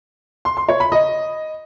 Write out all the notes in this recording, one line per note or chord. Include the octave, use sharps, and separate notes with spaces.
C6
C6
C#5
B5
D#5